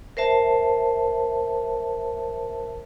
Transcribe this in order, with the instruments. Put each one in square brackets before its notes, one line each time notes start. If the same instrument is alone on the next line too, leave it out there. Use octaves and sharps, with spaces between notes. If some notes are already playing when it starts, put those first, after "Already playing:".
[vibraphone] A#4 C5 E5 A5